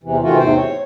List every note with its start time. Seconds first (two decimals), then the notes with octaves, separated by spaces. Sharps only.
0.04 E2 C3 E3
0.23 C3 D#3 E3 A3 F4 F#4
0.38 E2 G#2 C3 C4 C5 G5
0.56 C#5